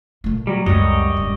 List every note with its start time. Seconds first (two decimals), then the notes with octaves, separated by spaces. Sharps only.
0.24 A#2 A3
0.47 F#3 G3
0.66 C#2 F#2 G3 A3 C#5 D#5
1.17 E1